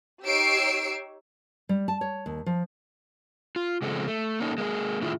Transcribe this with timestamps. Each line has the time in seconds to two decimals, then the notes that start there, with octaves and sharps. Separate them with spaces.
0.25 D#4 G4 C#5 E6 C7 D7
1.69 G3
1.88 A5
2.01 C#5
2.26 D#2
2.46 F3
3.56 F4
3.82 C#3 F3 G#3 C4 A4
4.07 A3
4.40 A#3 C#4 D#4 A4
4.58 G#3 A#3 D4 G#4
5.02 A2 D3 D#3 E4 F4 G#4